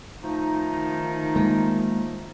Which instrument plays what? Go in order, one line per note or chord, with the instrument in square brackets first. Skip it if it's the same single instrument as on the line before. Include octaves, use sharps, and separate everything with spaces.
[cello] D#3 [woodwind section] F3 A3 D#4
[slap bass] G#3 A#3